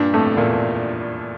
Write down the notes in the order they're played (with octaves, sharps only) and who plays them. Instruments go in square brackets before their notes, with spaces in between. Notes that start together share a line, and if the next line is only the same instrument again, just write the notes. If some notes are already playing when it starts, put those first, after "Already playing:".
Already playing: [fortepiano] G2 A#2 [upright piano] D4
[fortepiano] F2 A2 [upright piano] A3
[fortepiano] E2 [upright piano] A#2